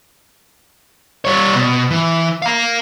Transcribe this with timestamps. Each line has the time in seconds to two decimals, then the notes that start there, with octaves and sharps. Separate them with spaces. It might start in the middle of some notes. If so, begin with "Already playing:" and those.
1.25 G3 C#5
1.55 B2
1.90 E3
2.42 F5 A#5